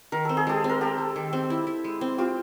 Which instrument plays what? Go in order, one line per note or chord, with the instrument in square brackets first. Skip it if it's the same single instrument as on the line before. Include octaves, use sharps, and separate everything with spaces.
[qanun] D#3 [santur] A#4
[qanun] C4 [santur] A4
[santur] G#4
[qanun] G#3 [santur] G4 A4
[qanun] C4
[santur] A#4
[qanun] C4 [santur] G4 A4
[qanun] G#3
D#3
C4
E4
E4
G#3
C4
[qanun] C4 [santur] F4 G4